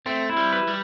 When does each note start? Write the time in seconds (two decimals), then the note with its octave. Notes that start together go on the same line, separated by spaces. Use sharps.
0.06 A3 C4
0.30 E4
0.37 G3
0.53 B4
0.68 G3